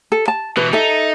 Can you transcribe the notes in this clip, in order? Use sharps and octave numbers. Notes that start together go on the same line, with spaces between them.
A4
A5
B2 E3 B4
D#4 A4 E5